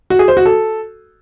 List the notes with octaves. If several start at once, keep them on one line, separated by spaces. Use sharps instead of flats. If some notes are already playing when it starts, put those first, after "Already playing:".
F#4
G#4
C5
F#4
A4